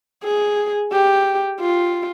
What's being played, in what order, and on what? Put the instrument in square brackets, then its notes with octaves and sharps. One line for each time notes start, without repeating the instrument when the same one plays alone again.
[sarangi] G#4
G4
F4